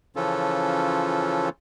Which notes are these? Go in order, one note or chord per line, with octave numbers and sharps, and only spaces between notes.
C#3 E3 F3 C#4 F4 A4